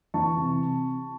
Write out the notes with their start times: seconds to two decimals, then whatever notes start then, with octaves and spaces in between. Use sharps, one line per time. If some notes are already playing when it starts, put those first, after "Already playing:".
0.14 E3 A5 C#6
0.37 C3